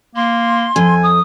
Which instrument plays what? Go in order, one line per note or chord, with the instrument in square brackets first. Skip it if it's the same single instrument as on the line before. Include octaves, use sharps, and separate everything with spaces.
[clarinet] A#3 [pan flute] C6
[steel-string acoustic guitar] F2 [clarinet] G#5
[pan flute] D#6